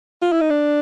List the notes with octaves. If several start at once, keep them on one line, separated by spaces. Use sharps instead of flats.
F4
E4
D#4
D4